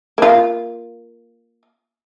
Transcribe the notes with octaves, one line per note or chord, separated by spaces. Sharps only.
A#3 F4